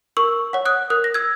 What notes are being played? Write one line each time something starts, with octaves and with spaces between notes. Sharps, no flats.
A#4 C#6 E6
C#5 F#5
D#6 F#6
A#4 D#6 F#6
A#6
E6 G#6